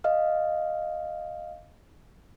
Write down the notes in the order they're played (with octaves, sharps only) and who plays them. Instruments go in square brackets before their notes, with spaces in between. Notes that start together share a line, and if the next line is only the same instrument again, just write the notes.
[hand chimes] D#5 F5 F6